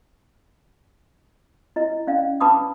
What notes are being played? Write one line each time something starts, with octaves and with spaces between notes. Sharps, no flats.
E4 D#5
C#4 D5 F5
D4 B4 A5 B5 D6 D#6